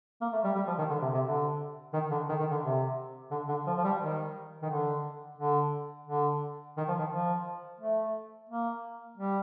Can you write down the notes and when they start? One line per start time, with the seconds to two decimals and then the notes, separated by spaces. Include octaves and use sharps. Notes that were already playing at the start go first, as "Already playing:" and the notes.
0.21 A#3
0.33 A3
0.44 G3
0.55 G3
0.67 F3
0.78 D#3
0.90 D3
1.02 C3
1.14 C3
1.25 D3
1.93 D#3
2.11 D3
2.29 D#3
2.40 D#3
2.51 D3
2.62 C3
3.31 D3
3.48 D3
3.67 F3
3.77 F3
3.84 G3
4.00 D#3
4.62 D#3
4.70 D3
5.38 D3
6.07 D3
6.77 D#3
6.88 F3
6.99 D#3
7.12 F3
7.80 A3
8.49 A#3
9.18 G3